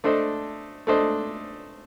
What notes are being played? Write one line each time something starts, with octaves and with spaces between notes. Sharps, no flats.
A3 D4 A4 C5 D#5
A3 D4 A4 C5 D#5